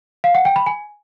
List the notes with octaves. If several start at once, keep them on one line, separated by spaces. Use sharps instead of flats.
F5
F#5
G5
B5
G#5